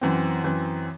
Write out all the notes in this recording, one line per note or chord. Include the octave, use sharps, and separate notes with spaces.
F#2 E3 C4
F#2 E3 C4